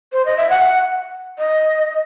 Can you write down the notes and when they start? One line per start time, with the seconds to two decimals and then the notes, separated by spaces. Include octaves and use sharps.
0.12 C5
0.25 D#5
0.37 E5
0.50 F#5
1.39 D#5